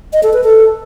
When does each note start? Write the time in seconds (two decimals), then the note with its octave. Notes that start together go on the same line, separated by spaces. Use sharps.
0.13 D#5
0.23 A4
0.33 B4
0.44 A4